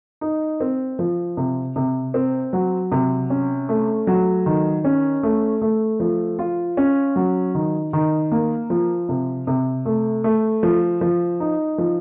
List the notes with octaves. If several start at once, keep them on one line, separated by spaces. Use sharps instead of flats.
D#4
C4
F3
C3
C3
C4
F#3
C3
C#4
A3
F#3
D#3
C#4
A3
A3
F3
F4
C#4
F#3
D#3
D#3
A#3
F3
C3
C3
A3
A3
F3
F3
D#4
F3